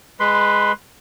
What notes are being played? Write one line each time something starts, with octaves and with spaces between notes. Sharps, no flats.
G#3 B4 B5 C6